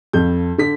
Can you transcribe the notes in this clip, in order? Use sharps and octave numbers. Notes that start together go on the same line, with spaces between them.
F2 G6
D3 B6